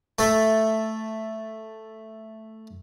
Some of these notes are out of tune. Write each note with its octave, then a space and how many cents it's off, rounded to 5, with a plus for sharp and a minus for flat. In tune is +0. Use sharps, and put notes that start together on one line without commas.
A3 +0 A4 +0 E5 +0